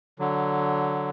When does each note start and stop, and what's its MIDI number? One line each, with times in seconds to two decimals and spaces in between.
0.19 1.10 50
0.19 1.10 54